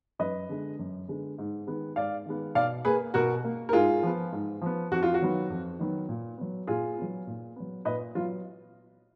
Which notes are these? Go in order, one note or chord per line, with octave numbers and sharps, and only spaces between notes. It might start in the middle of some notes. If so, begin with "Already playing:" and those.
F#2 B4 D#5
D3 G#3 B3
F#2
D3 G#3 B3
G#2
D#3 G#3 B3
G#2 D5 F5
D#3 G#3 B3
B2 D5 F5
A#3 G#4 B4
B2 F#4 A#4
A#3
A#4
G#2 F4 G#4
F3 B3
G#2
F3 B3
F2 F#4
F4
F#4
D#3 F#3 B3
F2
D#3 F#3 B3
A#2
F#3 B3
A#2 F4 G#4
F#3 B3
A#2
F#3 B3
A#2 B4 D#5
F#3 B3 F4